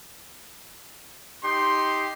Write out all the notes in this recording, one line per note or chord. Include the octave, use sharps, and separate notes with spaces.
D#4 G4 C6